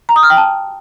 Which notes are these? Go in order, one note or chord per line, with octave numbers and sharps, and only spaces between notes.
A#5
D#6
F6
G5
A5